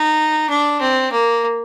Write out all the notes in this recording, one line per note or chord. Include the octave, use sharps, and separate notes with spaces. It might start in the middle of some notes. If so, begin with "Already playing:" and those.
Already playing: D#4
D4
C4
A#3